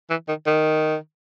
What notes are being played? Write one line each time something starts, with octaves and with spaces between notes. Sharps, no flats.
E3
D#3
D#3